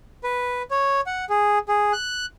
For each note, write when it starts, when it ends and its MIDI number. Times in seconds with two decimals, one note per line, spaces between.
0.24 0.62 71
0.71 1.01 73
1.06 1.25 78
1.29 1.59 68
1.68 1.92 68
1.93 2.26 90